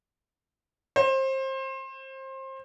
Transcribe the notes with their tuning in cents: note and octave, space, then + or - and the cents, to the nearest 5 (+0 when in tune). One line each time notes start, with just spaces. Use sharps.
C5 +25